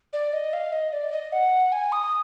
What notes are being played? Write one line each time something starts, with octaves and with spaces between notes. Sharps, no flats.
D5
D#5
F5
D#5
D5
D#5
F#5
G#5
D#6